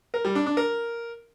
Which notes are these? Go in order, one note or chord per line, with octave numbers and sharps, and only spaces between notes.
A#4
G3
D4
D4
A#4